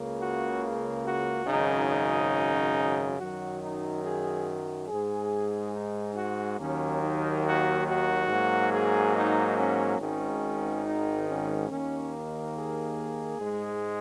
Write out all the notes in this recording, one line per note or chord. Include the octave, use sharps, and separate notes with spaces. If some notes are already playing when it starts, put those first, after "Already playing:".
Already playing: C#2 C#3 A#3
F#4
F#4
G#1 F#2 C#3 D#4
D#4
F#2 D#3 F#3 F#4
D#4
G#4
G#2 G#3 G#4
D#4
F#4
D#2 D#3 F#3 A#3 C#4
D#4
F#4
F#4
G#2 F#3 A#3
G#4
D#4
C#4
G#1 G#2 D#3 C#4
D#4
C#4
D#2 D#3 A#3 C#4
G#4
G#2 G#3